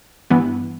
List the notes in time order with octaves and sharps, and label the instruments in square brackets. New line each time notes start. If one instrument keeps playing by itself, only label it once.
[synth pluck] G2 E3 B3